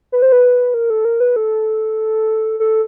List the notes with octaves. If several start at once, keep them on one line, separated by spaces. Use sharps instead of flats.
B4
C5
B4
A#4
A4
A#4
B4
A4
A4